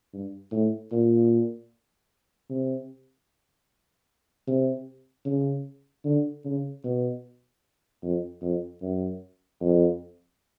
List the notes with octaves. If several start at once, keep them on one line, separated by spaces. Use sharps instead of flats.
G2
A2
A#2
C3
C3
C#3
D3
C#3
B2
F2
F2
F#2
F2